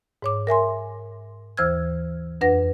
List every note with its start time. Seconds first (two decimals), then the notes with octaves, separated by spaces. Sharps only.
0.22 G#2 C#5 D6
0.47 A#4 E5 G#5 C6
1.57 D#2 E3 C5 E6 F6 G#6
2.41 F2 D4 B4 F#5 A#6